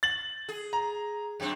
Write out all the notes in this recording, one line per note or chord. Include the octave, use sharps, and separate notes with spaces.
A6 F#7
G#4
A#5
F#2 C4